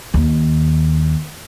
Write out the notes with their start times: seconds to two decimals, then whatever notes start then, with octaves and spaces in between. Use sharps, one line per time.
0.14 D#2